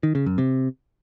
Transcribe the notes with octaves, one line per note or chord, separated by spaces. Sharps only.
D#3
C#3
F#2
C3